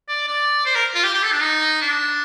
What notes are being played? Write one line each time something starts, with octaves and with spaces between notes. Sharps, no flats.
D5
D5
C5
A#4
F4
G4
G4
A4
D4
D#4
D4